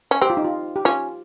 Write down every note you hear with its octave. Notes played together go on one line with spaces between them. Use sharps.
C#4
C4 G4
F4
D#4
F4
G4
C#4 F4